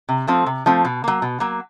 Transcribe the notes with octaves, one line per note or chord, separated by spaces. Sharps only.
C3
F3 A3 C4
C3
F3 A3 C4
B2
F#3 A#3
B2
F#3 A#3